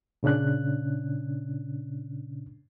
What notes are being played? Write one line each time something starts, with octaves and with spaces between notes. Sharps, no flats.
A#2 C#3 C#4 D4 F#6